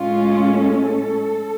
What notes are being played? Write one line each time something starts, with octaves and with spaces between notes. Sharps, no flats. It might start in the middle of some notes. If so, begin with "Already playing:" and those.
Already playing: A2 G#3 C#4 F4
A4